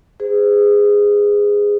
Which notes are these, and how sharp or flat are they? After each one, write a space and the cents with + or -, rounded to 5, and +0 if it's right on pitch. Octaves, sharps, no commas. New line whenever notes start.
G#4 -15 C5 -45